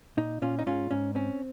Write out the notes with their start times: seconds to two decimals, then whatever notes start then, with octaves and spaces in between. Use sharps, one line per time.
0.17 A#2 D#4
0.42 A#2 C#4 F4
0.59 D#4
0.66 G#2 C#4 F4
0.91 G#2 C#4
1.15 C4 C#4